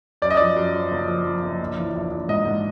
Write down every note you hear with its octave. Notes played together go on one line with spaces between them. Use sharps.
F#2 D5
D#5
F3 D5
F#2
F3
F#1
F3
F3
F#1
A#1
E3
A#1
A#1
G#2 D#5
G#2